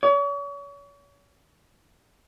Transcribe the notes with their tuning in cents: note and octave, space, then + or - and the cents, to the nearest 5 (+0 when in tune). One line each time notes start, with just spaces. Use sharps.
C#5 +40